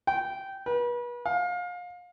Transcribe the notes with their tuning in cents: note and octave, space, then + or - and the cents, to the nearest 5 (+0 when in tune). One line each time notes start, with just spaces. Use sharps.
G5 -15
B4 -35
F5 +30